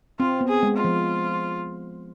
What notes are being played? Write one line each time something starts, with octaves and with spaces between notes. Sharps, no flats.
C4 F4
B3
G#4
G#3
F4
F3